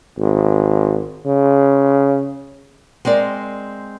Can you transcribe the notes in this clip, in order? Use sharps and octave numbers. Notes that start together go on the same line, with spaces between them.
G#1
C#3
G#3 C4 A#4 D5